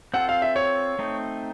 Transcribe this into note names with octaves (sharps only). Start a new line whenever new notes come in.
C4 F4 A4 F#5
F5
E5
C#5
A3 C4 D#4